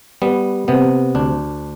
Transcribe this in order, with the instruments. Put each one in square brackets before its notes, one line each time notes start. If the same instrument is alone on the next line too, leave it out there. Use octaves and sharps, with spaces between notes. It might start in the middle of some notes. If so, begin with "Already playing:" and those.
[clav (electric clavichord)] G3 B3
C3 B3
D2 D4